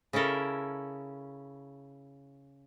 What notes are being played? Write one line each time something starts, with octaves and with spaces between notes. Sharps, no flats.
C#3 C#4 E4 A4 A#4